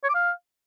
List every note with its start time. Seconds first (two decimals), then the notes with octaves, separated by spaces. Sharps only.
0.04 C#5
0.09 D6
0.14 F5